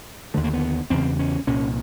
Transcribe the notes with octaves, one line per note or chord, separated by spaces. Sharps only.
D#2 D3 A3
A#3
B3
E2 C#3 C4
C#4
C2 A#2 C#4